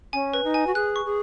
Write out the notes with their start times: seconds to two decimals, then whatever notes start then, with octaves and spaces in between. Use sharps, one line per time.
0.13 C#4 G#5
0.33 B4
0.44 D#4
0.54 G#5
0.67 F#4
0.75 G#4 F#6
0.96 C#6
1.06 G#4